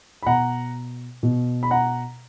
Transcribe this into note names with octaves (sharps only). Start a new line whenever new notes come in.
B5
B2 F#5 A#5
B2
B5
F#5 A#5